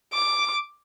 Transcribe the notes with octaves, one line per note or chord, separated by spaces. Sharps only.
D6